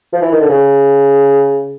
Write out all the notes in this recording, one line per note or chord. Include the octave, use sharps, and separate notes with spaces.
F3
E3
D#3
D3
C#3